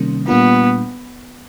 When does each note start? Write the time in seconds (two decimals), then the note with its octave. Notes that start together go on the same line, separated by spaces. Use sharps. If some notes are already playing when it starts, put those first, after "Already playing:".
Already playing: C3 D#3 G3 A#3 C#4
0.28 A#2 G3 A#3 B3 D4 F4